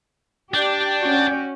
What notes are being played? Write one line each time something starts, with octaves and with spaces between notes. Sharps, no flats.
D4 G4 D5 G5
C#4 F#4